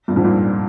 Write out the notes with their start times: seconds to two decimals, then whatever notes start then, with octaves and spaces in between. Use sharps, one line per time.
0.08 G2 A#2
0.16 F2 G#2
0.24 G2 A#2